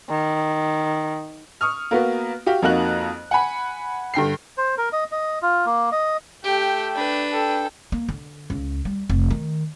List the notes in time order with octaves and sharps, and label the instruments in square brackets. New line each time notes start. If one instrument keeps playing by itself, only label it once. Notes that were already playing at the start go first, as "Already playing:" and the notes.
[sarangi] D#3
[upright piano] C#6 D#6 F6
A#3 B3 F#4
F#4 G4 F5
F2 A#3 D#4 F#4 F#6 F#7
F#5 G#5 B5
G2 D3 G5 C7
[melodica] C5
A#4
D#5
D#5
F4
A#3
D#5
[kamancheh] A3 G5 [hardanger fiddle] G4
[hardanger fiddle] D4 B4
[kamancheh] A4 G5
[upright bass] A#3
D3
C#2
G3
F1
D#3